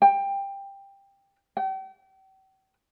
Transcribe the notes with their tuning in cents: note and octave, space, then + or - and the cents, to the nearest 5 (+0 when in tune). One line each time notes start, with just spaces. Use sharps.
G5 +15
G5 -40